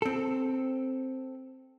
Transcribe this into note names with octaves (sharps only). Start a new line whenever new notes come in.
C4 A4